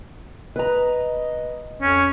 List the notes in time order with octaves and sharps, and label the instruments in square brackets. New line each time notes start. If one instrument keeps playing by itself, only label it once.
[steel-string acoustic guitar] B4 A#5 [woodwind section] D#5
[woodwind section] F2 [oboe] C#4